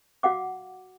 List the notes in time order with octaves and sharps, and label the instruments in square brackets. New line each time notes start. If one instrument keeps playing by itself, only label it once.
[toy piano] F#4 F5 F#5 D6